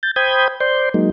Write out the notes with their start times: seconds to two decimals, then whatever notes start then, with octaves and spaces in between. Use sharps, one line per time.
0.03 G6 A6
0.16 C5 G5 B5 D#6 G6 G#6
0.60 C5 D5 C6 G6
0.94 F#3 G#3 A#3 D#4